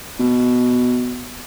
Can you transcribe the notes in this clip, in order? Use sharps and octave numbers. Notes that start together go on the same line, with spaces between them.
B2